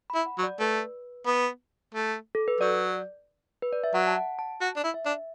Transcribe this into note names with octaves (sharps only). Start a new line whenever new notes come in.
B5
E4
F#5
F#3
D5
A3 B4
B3
A3
A4
B4
F#3 D5
B4
D5
E5
F#3 F#5
A5
F#5
A5
F#4
D4
E4
E5
D4